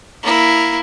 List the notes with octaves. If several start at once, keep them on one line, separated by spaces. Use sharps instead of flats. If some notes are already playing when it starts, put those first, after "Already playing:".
A#3 E4